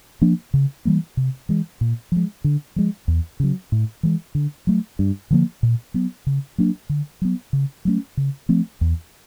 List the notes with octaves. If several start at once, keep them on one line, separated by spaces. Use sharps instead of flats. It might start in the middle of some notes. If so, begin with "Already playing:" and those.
F3 A#3 D4
C#3
E3 G3 A#3
C3
E3 G#3
A#2
F3 G#3
D3
F3 G#3
E2
C#3 F#3
A2
E3 G#3
D3
F#3 A3
G2
D3 F3 A#3
A#2
F#3 B3
C#3
F#3 A#3 D4
D3
F#3 B3
C#3
F#3 A3 C#4
C#3
F3 A3 C4
E2